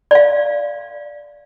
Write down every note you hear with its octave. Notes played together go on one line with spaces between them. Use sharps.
D5 F5